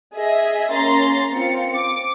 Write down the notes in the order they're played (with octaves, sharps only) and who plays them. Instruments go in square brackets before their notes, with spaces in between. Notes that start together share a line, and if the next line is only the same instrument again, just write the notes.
[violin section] G#4 D#5 E5
A#3 C#4 A#5 C6 A6
C4 F4 C#7
D6